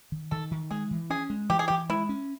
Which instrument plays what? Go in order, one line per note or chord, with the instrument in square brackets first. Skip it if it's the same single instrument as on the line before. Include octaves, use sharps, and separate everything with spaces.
[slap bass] D#3
[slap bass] D#3 [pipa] A4
[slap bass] D#3
[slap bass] G#3 [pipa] G#4
[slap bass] E3
[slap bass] C#4 [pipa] G#4
[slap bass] G#3
[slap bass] E3 [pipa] G4
[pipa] G#4
[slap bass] E3 [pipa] G4
[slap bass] G#3 [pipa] E4
[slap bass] C#4